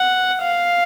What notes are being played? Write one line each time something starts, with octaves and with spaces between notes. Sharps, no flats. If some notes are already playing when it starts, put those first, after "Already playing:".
Already playing: F#5
F5